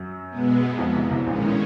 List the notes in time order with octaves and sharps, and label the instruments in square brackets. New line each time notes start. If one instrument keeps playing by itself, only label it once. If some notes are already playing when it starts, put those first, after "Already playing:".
Already playing: [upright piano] F#2 F#3
[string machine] B2 G#3 B3
[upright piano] F2 F3
C2 C3
C2 C3
[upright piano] A#1 A#2 [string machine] D#3 G#3 C#4
[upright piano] A2